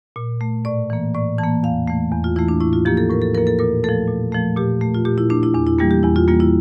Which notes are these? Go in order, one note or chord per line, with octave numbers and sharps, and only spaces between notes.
A#2
A3
A2 D5
E3 A#3
A2 D5
E3 A5
A#3
E2 F5
E3 A3
E2
F4
E3 A3 E4
D4
A2 E4
F4
F3 A#3 G4
A4
A2 A#4
A4
F3 A#3 A#4
A4
A#2 A#4
F3 A3 A4
A#2
F3 A3
A#2 G4
A3
F4
A#2 G4
E4
A3 D4
E4
E2 D4
E4
E3 G3 A#3 G4
G4
E2 E4
F4
E3 G3 A#3 F4
E4